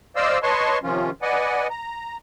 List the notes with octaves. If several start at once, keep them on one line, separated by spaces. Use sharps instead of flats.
C5 D5 D#5 F5 E6
B4 C#5 D#5 A5 C6 C#6
C3 D#3 F3 C#4 F4
B4 D5 D#5 F#5 G#5
A#5